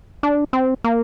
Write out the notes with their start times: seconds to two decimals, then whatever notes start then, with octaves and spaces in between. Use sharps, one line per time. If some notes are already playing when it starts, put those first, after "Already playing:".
0.23 D4
0.53 C4
0.84 A#3